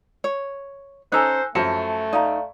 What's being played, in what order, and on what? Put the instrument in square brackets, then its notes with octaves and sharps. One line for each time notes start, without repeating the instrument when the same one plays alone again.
[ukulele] C#5
[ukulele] C#4 A#5 [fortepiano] D#4 A4 [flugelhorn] C5 [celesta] G#5 E6 F#6
[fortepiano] F#2 F3 [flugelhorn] A3 [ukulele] A5 [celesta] C#7
[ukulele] D#4 [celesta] D5 F5 A#5